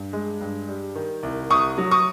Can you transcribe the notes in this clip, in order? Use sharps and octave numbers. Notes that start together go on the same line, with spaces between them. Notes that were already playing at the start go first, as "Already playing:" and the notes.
Already playing: G2
G#3
G2
G3
D#3
C2
C2 C#6 D#6
F#3
C#6 D#6